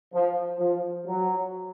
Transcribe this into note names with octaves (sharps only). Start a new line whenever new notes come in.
F3
F3
F#3